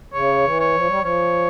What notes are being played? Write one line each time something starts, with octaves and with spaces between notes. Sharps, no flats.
C#3 C#5
E3
C#5
F3
G3
F3 C#5